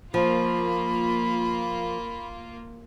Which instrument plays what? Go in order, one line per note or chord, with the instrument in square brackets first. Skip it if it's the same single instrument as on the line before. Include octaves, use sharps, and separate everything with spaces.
[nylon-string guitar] F3 [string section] A#3 F4 [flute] B5